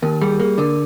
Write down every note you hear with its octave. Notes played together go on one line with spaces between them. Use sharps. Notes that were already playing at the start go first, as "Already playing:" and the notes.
D#2 A#4
G3 G#4
A#3 G#4
D3 A#4